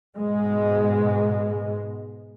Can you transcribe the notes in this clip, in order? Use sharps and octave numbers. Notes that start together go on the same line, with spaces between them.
G#2 B2 G#3